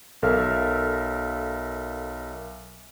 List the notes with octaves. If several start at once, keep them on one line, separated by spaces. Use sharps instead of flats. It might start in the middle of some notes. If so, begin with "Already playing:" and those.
B1 A4 A#4 E5 F5 F6